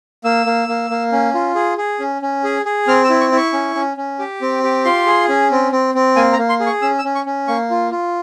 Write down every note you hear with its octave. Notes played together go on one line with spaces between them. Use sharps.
A#3 E6
A#3
A#3
A#3
C#4
F4
G#4
G#4
C#4
C#4
G#4
G#4
C4 F6
E6
E4
C#6
E4
C#6
C#4
C#4
C#4
G4
C4
G4
F4 C6
G#4
C#4
C4
C4
C4
A#3 G#5
A#5
A#3
C6
G#4
C#6
C#4 E6
E6
C#4
C#6
C#4
A#3 C#6
F4
F4